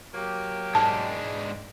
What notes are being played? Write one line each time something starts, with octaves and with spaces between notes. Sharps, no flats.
F#3 A#3 G4
G#2 G#3 D4 A5